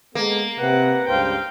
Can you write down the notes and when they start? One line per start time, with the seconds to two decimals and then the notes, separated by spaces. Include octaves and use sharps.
0.15 G#3 A#3 B3 A4
0.60 C3 B4 F#5
1.08 C#2 G2 C5 F5 G5